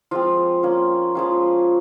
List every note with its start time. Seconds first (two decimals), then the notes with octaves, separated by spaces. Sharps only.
0.11 F3 G#3 C4 F4
0.63 A#3 C#4 F4
1.15 F3 G#3 C#4 F4